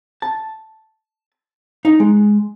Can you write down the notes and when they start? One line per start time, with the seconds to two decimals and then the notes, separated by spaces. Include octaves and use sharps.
0.22 A5
1.85 D#4
2.00 G#3